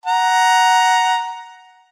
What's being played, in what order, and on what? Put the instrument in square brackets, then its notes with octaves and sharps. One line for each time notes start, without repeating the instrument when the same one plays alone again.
[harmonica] F#5 A#5